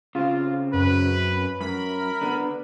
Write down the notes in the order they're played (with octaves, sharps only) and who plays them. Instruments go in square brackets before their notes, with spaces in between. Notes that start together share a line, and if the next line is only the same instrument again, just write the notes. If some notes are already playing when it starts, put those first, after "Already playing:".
[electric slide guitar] C#3 C4 [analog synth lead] F4
[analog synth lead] F#2 [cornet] B4
[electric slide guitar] F#2 [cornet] A#4 [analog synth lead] B5
[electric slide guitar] D3 B3